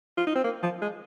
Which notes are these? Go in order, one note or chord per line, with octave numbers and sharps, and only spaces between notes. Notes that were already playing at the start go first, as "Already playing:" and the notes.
F4
D#4
C4
A#3
F3
G#3